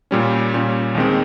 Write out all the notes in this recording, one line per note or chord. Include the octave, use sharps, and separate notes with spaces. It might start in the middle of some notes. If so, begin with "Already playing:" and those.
A#2 G3 C#4
A#2 G3 C#4
D#2 D#3 G#3 C4